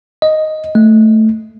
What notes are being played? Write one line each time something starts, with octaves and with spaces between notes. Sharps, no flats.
D#5
A3